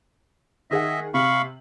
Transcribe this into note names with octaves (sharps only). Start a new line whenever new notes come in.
D#3 G#4 D#5 E5 F#5
C3 F5 B5 C#6 F#7